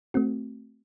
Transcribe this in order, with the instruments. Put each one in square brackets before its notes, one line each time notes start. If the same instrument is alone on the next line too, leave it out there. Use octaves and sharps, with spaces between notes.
[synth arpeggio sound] A3 C4 F#4